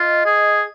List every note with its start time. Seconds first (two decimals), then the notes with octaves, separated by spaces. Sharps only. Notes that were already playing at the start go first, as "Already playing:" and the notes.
Already playing: F4 D#5
0.26 G#4